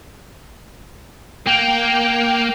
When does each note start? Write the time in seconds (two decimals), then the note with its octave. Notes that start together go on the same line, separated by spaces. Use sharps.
1.47 A#3 G5